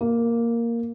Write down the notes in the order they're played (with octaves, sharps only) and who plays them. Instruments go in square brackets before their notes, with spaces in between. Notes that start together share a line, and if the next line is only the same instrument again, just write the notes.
[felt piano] A#3